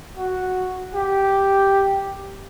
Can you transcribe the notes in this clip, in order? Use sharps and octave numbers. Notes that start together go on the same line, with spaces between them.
F#4
G4